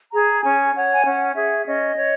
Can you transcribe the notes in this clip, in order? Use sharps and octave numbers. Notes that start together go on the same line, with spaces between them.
G#4 A#5
C#4 G#5
C#5 F#5
G#5
C#4 F#5
G#4 E5
C#4 D#5
C#5